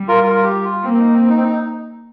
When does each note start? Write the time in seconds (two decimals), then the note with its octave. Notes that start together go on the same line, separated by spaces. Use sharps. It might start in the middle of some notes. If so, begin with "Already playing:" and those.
Already playing: G3
0.08 F4 A#4
0.23 F4 A#4
0.36 F4
0.44 G4
0.64 F4
0.84 A#3 C4
0.94 C4
0.99 D#4
1.13 C4
1.29 D#4
1.37 C4
1.44 D#4